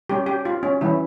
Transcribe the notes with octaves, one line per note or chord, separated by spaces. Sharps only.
G3 C#4 G4
G4
F4
C#4
E3 G3 C#4 E4